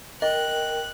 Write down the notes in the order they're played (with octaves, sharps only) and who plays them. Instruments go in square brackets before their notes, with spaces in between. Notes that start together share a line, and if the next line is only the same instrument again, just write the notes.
[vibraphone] A#4 G5 [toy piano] D#5 [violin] F#6